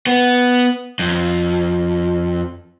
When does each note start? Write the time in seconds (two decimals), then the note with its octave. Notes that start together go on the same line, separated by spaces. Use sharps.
0.07 B3
0.99 F2